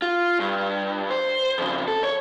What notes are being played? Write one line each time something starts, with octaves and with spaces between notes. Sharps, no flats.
F4
G2
C5
F2 C#3
A4
C#5